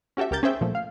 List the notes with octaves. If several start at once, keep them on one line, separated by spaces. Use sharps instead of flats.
C#4 F#4 G4 A4 E5
C#2 G4 A#4 G6 A6
C#4 G#4 C5 E5 G5
A#2 F3 A3
F5